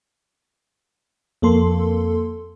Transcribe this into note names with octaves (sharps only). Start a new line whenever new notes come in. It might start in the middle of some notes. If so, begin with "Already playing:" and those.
F2 A#3 A4 C6